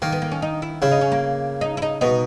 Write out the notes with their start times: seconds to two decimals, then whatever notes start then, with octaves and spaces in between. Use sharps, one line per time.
0.02 D#3 A#3
0.12 B3
0.22 A#3
0.32 C#4
0.42 D#4
0.62 E4
0.82 C#3 E4
0.91 D#4
1.01 C#4
1.12 A#3
1.61 D#4
1.77 E4
1.82 D#4
2.01 B2 D#4